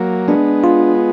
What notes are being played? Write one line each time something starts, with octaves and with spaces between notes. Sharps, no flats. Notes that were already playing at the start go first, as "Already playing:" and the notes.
Already playing: F#3 A#3
G#3 B3 D4
F4